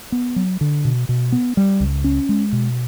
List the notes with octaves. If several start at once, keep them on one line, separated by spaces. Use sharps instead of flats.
B3
F#3
D3
B2
B2
B3
G3
C#2
C#4
G#3
B2